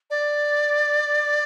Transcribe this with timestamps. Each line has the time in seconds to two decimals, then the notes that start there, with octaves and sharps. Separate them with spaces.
0.10 D5